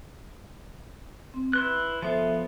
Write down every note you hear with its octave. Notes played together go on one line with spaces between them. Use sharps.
C4
E4 B4 C6 F#6
F3 B3 F4 A4 C5 E5